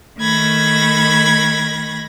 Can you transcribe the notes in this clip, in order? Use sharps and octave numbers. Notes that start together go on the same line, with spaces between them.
D#3 A3 B5 G#6 A#6